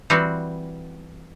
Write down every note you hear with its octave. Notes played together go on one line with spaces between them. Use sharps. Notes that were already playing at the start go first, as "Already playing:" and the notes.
E3 G3 C4 F#4